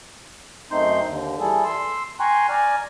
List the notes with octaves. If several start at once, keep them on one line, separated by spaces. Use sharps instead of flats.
F#2 A3 C4 D#4 C6 G6
D#2 D3
E3 G3 G#4 A4
C6 E6
G5 G#5 A#5 C6 C#6 F#6
D5 G#5 A#5 F6